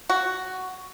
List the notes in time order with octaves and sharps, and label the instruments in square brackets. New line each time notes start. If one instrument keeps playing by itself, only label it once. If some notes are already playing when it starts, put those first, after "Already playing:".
[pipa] F#4